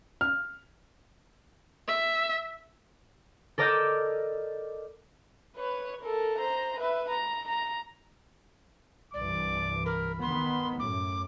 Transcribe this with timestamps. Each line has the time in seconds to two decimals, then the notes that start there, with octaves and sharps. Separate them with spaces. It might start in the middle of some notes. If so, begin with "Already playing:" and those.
0.21 F6
1.88 E5
3.58 A4 A#4 D5 D#5 E6 G6
5.56 B4 C#5
6.02 A4 A#4
6.39 C5 A#5
6.79 B4 E5
7.10 A#5
7.48 A#5
9.14 C2 G2 E3 D5 D6
9.86 A#4 B5
10.22 D#3 B3 C6
10.79 F#2 A2 D6